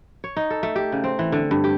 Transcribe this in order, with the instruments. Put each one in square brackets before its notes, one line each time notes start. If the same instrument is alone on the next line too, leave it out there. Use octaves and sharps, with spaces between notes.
[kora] C#5
D#4
A4
A3
G4
C#3
C4
E3
D3
G2
G4